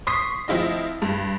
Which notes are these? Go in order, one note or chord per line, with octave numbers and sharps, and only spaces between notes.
C6 C#6 D#6 B6 C7
F3 C4 E4 F4 D#5
G2